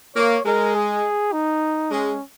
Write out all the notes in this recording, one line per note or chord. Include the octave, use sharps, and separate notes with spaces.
A#3 C#5
G#3 A#4
G#4
D#4
G#3 C#4